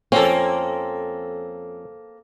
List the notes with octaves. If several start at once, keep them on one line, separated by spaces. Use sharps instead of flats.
F2 A#3 C4 C#4 A4